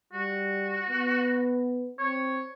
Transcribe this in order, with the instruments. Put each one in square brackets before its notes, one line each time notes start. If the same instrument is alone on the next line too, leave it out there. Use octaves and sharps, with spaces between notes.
[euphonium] G3 [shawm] F#4
[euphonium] B3
[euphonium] C4 [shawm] C#5